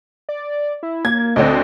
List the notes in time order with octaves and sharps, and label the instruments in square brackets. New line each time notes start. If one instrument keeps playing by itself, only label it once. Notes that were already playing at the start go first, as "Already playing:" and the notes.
[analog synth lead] D5
E4
[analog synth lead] A#3 [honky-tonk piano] G#6
[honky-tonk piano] D2 D3 C4 [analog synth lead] D#5